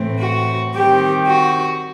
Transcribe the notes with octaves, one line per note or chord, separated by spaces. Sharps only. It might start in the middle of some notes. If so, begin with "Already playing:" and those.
Already playing: A2 E3 A3 C4
F#4
D#3 G3 C4 G4
F#4